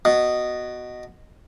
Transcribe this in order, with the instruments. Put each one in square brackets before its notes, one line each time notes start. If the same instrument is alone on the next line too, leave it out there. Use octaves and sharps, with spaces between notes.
[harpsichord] B2